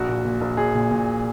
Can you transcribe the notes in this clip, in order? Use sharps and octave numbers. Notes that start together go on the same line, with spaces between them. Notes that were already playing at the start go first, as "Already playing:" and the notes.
Already playing: A#1 F#4
A#2
A#2
A#1
A#1 G#4
A#2
A#2